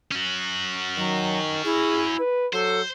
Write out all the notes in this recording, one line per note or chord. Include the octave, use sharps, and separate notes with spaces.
C#4 F#4
D#3 F#3
E4 G#4
B4
F#3 A4 C5